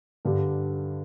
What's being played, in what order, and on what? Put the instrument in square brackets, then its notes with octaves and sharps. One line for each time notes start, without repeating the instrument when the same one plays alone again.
[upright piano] G2 D3 G3